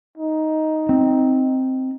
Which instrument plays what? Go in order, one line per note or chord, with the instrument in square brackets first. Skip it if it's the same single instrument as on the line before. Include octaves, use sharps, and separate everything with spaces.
[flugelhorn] D#4
[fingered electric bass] C4